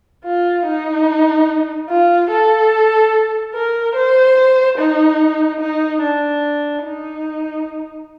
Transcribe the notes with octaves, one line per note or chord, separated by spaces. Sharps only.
F4
D#4
F4
A4
A#4
C5
D#4
D#4
D4
D#4